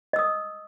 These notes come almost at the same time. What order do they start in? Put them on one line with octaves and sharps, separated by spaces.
D#5 E6 D#6